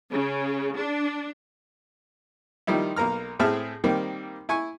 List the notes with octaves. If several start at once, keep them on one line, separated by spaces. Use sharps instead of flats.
C#3
D4
D#3 F3 G3 D#4 E4
B1 A#3 A#4 A#5 F6
A2 C4 G#4 E5 A5 F6
D#3 G3 A#3 C4
E4 G#5 C#6